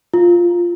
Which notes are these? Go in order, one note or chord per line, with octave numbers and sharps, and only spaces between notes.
F4